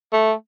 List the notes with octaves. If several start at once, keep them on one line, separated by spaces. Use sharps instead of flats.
A3